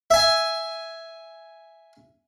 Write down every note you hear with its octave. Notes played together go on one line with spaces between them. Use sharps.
E5 G#5